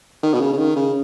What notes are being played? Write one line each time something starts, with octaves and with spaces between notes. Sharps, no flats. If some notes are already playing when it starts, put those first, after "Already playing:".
D#3
B2
C#3
C#3
D#3
C#3